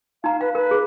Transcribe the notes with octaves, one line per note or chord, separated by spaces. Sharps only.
D#4 F5 A#5
B4 F5
A#4 B4
G#4